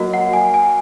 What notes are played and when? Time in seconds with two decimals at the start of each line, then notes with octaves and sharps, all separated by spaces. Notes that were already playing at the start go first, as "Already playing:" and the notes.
Already playing: F#3 A#3 F#4 D#5
0.13 F#5
0.33 G#5
0.54 G#5